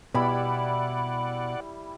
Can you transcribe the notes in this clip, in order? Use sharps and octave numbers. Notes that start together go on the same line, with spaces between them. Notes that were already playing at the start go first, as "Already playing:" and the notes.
B2 G3 E4 D5 F#5 B5